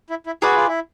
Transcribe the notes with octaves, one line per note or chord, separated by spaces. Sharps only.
E4
E4
F#4 G#4 B4 D5
F4
E4